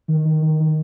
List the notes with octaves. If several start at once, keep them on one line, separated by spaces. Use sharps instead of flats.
D#3
D#3
D#3
D#3